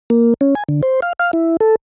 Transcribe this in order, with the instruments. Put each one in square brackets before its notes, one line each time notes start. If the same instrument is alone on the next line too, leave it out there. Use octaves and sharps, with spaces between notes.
[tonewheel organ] A#3
C#4
G#5
D3
C5
F5
F5
E4
A4